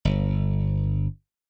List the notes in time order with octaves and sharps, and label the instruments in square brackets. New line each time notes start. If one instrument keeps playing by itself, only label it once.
[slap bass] G1